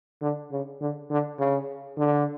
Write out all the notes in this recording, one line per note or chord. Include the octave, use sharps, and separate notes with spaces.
D3
C#3
D3
D3
C#3
D3